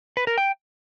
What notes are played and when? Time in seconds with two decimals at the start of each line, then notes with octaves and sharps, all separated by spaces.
0.17 B4
0.27 A#4
0.38 G5